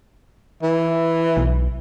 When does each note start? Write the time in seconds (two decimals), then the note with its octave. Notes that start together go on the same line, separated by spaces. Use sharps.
0.63 E3 E5
1.37 B1